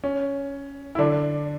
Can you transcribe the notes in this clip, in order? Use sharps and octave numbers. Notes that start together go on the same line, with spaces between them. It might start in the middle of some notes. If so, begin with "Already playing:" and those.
C#4
E4
D3 D4